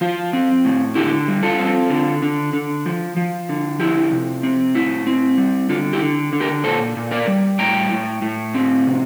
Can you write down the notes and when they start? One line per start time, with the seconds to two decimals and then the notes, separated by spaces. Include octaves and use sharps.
0.01 F3 F4
0.33 C4
0.65 A2
0.95 D3 E4 G4
1.28 G3
1.43 F4 A4
1.59 C4
1.90 D3
2.22 D3
2.53 D3
2.86 F3
3.16 F3
3.49 D3
3.80 F3 E4 G4
4.12 C3
4.43 C4
4.75 A2 E4
5.07 C4
5.38 G3
5.69 D3 F4
5.93 E4 G4
6.02 D3
6.33 D3
6.40 G4 A#4
6.64 A#2 A4 C5
6.97 A#2
7.11 A#4 D5
7.27 G3
7.59 A2 G5 A#5
7.91 A2
8.22 A2
8.54 C4
8.86 C3